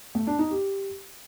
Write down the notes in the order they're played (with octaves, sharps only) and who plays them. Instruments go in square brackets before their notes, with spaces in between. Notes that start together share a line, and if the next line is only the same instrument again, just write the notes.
[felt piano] A3
D4
D#4
G4